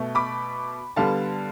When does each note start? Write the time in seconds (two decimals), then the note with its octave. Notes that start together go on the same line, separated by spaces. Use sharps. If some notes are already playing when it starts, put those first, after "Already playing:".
Already playing: B2 A3
0.15 B5 D6
0.96 D3 G3 B3 F5 A5